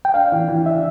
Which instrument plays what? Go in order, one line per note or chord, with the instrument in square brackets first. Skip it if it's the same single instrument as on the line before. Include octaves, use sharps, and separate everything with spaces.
[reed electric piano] G5
[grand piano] D4 [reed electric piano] F5
[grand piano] E3
E3
[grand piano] D4 [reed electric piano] E5